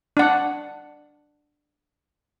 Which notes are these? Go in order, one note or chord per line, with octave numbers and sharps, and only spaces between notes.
D4 F#5